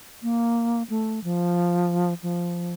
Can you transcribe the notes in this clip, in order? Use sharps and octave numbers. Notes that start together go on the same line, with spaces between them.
A#3
A3
F3
F3